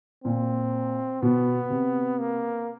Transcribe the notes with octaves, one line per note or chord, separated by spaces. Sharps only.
A#2 C4
B2 B3
C3
A#3